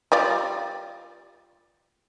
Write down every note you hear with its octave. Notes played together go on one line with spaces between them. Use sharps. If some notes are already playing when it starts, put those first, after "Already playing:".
G3 F4 D5